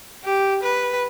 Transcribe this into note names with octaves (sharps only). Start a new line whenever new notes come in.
G4
B4